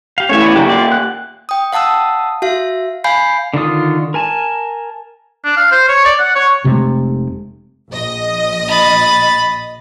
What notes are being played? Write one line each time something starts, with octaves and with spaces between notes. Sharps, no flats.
G4 F5
E3 A3 C#4 C#5 E5
B3 D5
A#2 C#3 F#3 D4 G4
F4 D5
F#6
G5 D#6
F5 F#5 A5 D#6 E6
F#4 E5 F5
F5 G#5 B5 G6 C7
D3 D#3 F4 D#6
A#4 G#5 A5
D4
F5
C5
C#5
D5
F#5
C#5
F1 C3 G#3 A3
A#1 D#5
B5 A6